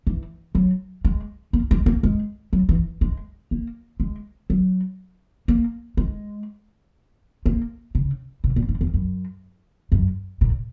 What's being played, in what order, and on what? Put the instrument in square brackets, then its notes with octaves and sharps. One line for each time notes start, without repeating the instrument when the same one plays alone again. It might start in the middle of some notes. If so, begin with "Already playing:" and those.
[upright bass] E3
F#3
G#3
A#3
G#3
A#3
G#3
F#3
E3
G#3
A#3
G#3
F#3
A#3
G#3
A#3
C#3
B2
A#2
G#2
E2
F#2
F#2
A#2